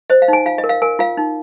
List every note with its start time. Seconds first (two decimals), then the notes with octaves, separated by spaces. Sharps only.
0.10 C5 D#5
0.22 F5
0.28 D#4 G#5
0.46 F4 F5
0.58 D#5
0.64 A#4
0.69 F5
0.82 A#4 G#5
0.99 F4 F5
1.17 D#4